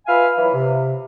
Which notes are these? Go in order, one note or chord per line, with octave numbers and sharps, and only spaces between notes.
F4 B4 E5 F5 G#5 F6
E3 F#3 E4
C3